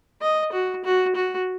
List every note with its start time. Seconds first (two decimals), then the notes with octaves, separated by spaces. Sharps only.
0.21 D#5
0.52 F#4
0.84 F#4
1.15 F#4